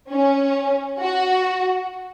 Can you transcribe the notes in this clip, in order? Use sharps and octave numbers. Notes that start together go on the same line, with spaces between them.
C#4
F#4